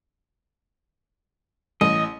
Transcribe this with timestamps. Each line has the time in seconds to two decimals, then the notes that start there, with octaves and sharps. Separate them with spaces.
1.81 A1 D#5